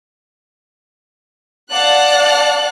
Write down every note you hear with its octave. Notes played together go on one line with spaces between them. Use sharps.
D5 F5 F#5 A5 F#6